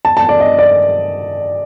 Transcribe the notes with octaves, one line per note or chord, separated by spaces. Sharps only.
A5
A5
D5
D#5
D5